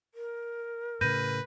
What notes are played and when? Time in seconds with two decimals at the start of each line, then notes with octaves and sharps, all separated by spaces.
0.15 A#4
1.01 A2 C#3 B4 G6 A#6 D#7